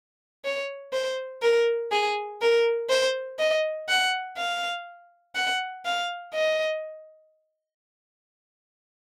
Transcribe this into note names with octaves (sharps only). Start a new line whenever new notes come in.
C#5
C5
A#4
G#4
A#4
C5
D#5
F#5
F5
F#5
F5
D#5